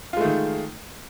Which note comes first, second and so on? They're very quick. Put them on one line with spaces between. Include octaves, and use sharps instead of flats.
F4 G#3 A3 D#3